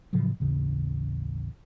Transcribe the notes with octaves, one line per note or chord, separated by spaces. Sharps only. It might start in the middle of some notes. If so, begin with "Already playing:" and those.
A2 C#3 F3 F#3
A1 D#2 C#3